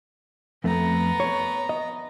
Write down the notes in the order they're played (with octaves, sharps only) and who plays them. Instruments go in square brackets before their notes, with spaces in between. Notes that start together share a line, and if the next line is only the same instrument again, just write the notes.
[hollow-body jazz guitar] F2 A3 [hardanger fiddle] B3 A#5
[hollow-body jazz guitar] C#5
D#5